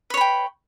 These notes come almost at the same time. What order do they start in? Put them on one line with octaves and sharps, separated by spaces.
B4 C#5 B5 G5